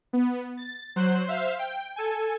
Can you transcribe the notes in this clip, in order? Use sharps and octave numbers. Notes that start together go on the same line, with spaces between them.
B3
A6
F#3 C5 F#6
C5 E5 F5
G5
A4 G#5